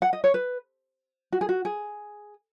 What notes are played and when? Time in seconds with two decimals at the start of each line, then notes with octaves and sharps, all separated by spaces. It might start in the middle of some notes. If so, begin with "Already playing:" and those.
0.02 F#5
0.13 D#5
0.24 C#5
0.34 B4
1.32 F#4
1.41 G#4
1.49 F#4
1.65 G#4